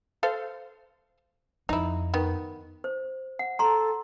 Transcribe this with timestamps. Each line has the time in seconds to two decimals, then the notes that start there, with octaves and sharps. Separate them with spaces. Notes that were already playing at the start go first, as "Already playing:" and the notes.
0.23 A4 C5 F5
1.69 F2 D#4 E4
2.14 D#3 B3
2.84 C5
3.39 F#5
3.59 A4 A#5 C6